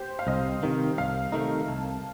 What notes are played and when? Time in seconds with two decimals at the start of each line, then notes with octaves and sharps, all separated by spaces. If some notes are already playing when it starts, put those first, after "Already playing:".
Already playing: G4 C5
0.19 F5
0.27 C2 D#5
0.63 C3 D#3
0.98 C2 F5
1.32 C3 D#3 A3 D#4
1.68 C2 A5